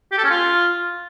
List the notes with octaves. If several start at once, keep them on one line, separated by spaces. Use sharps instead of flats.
G4
A4
C#4
F4